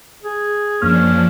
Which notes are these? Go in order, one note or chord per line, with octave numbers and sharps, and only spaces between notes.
G#4
F#2 F3 A#3 C#4 D4 F6